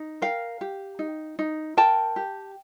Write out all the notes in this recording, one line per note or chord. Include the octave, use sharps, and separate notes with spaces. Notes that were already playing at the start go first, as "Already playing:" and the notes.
Already playing: D#4
A#4 F5 G5
G4
D#4
D#4
A#4 G5 A5
G4